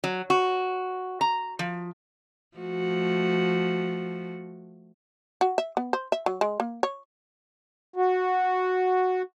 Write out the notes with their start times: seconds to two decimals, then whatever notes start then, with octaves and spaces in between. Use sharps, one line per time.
0.04 F#3
0.30 F#4
1.21 A#5
1.59 F3
2.57 F3 A3 F#4
5.41 F#4
5.58 E5
5.77 B3
5.93 C5
6.12 E5
6.26 F#3
6.41 G#3
6.60 A#3
6.83 C#5
7.96 F#4